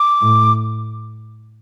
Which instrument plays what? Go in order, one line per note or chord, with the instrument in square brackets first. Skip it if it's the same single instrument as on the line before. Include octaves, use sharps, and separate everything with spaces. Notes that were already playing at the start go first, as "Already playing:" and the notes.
Already playing: [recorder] D6
[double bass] A2